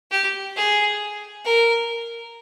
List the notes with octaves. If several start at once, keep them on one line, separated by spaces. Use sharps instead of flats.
G4
G#4
A#4